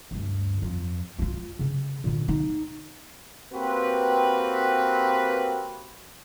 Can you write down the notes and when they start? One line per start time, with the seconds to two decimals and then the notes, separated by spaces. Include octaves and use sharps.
0.11 D2 G2
0.62 F2
1.19 E4 F4
1.59 C#3
2.04 A#2 D3
2.28 D#4
3.53 A#3 C4 F#4 G4 B4